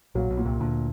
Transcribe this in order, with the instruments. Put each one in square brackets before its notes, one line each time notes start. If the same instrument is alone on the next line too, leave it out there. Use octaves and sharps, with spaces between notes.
[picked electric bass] A#1 A#2 [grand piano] F#3
[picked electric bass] B1 B2
[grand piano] A#2
[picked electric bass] C2 C3
[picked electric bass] D2 D3 [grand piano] A#2